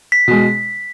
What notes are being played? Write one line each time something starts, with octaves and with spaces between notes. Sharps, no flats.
B6
B2 G#3